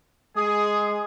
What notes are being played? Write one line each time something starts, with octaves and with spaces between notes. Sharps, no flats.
G#3 G#4 D#6